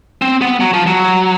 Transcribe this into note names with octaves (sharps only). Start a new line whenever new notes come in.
C4
B3
F#3
F3
F#3